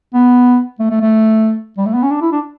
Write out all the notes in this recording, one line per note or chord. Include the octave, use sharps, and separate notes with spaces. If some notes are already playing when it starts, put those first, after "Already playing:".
B3
A3
A3
A3
G3
A3
B3
C#4
D4
E4
D4